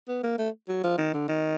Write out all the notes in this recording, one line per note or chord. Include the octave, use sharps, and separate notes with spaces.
B3
A#3
A3
F#3
F3
D#3
D3
D#3